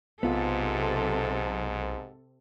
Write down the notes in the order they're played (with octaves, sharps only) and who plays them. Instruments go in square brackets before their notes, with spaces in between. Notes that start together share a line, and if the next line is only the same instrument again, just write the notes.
[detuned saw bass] B1 [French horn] G#2 [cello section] C3 A4 [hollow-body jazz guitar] B3 F4